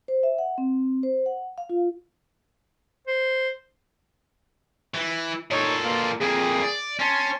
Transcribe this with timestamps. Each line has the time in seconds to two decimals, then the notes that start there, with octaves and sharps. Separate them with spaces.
0.08 C5
0.23 E5
0.38 F#5
0.58 C4
1.03 C5
1.26 F#5
1.58 F5
1.70 F4
3.07 C5
4.95 E3
5.51 A#2 D#4 A4 C#5
5.84 B2 A#3 F4
6.21 F2 A#3 G#4
6.62 D5
7.00 C#4 A5 C6